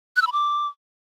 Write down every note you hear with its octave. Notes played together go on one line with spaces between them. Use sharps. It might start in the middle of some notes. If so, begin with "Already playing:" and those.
F#6
E6
B5
D6